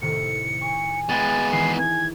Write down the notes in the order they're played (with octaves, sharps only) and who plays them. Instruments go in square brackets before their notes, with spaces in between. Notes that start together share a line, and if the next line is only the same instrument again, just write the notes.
[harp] A2 C3 D#3 [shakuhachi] A4 [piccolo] C#7
[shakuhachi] G#5 [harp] C#6
[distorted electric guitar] G#3 B3 [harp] G#4 G5 F#6 [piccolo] A6
[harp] D#3 E3 D#4 [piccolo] C7
[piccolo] G#6